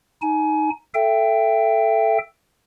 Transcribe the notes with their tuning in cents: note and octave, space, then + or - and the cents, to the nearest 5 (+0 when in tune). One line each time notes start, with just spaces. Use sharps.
D#4 +0 G#5 +30
A4 +0 E5 +25 G5 +0